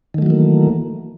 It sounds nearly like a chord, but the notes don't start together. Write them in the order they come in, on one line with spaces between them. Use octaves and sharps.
D#3 A3 F#3 E3 A#3